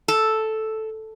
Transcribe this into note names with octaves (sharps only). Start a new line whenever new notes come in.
A4